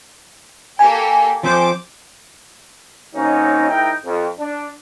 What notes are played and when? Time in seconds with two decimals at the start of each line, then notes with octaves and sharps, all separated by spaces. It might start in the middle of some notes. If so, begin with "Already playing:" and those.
0.79 A#3 G4 A4 G#5
1.43 F3 C4 C5 D6
3.15 D#3 F#3 A#3 C4 C#4 D#4
3.69 G#2 D#4 E4 A#4 G5
4.05 F2
4.39 D4